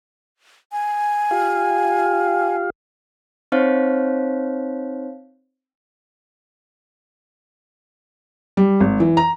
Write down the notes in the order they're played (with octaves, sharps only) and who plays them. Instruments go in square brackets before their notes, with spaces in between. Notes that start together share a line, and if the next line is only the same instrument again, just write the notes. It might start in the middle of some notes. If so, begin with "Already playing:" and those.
[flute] G#5
[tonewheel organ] F4 G4 F5
[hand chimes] C4 D#4 C5 C#5 F5
[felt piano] G3
G#1
E3
A#5